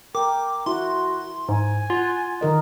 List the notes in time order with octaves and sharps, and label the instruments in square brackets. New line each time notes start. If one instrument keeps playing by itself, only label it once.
[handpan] A#4 [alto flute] G5 [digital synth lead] D6
[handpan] E4 [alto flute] F#4 [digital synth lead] C6
[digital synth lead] G#2 [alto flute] G#5
[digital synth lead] F4 [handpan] F#5
[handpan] D#3 A#4 D#5